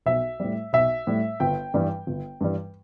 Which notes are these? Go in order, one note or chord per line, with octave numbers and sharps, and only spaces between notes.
B1 E5
A2 G3
B1 E5
A2 G3
G1 G5
G2 E3 G3
G1
G2 E3 G3